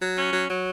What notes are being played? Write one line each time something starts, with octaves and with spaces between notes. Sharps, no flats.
F#3
C#4
F#3
F#3